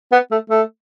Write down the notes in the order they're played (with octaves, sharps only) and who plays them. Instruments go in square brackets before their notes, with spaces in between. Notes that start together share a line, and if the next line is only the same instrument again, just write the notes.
[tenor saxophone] B3
A3
A3